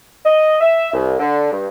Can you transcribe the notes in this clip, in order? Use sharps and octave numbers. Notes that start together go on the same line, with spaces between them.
D#5
E5
C2
D3
G2